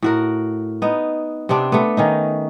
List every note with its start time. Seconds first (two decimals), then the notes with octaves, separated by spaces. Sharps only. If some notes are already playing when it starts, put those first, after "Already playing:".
0.03 A2 F#4 A#4
0.82 B3 D#4
1.49 C3 B3 C4 D4
1.72 A3 B3
1.97 D#3 C#4 D#4